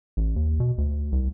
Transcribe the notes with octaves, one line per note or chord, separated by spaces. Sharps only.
A1
D#2
B2
D2
C2